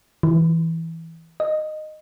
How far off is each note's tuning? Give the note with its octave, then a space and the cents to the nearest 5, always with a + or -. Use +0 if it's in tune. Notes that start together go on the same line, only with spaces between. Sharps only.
E3 -10
D#5 -15